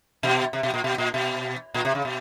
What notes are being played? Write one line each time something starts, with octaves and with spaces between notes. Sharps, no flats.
B2
C3
B2
A#2
B2
A#2
B2
A#2
C3
C#3
B2